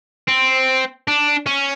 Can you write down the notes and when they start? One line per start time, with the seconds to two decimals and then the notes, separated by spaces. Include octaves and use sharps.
0.28 C4
1.08 D4
1.47 C#4